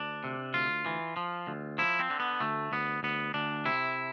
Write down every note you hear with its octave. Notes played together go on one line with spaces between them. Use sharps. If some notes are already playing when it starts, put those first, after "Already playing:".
Already playing: D2 D4
C3
D2 F4
E3
F3
D2
F3 E4
C4
D3
B3
D2 A3
D2 B3
D2 B3
D2 D4
C3 E4